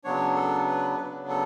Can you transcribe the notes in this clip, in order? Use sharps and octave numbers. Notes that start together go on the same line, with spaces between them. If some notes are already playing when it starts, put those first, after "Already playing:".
C#3 F#3 B3 D4 C#5
A4
B4
C#3 F#3 B3 D4 B4
A4